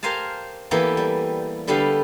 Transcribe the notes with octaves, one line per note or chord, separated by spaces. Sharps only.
G4 A#4 C5 F5 G#5 A5
E3 A#3 B3 G4 A4
G3
D3 G3 B3 G4 A4 F5